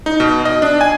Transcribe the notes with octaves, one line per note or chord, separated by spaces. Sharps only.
D#4
B2
D#5
D4
G#5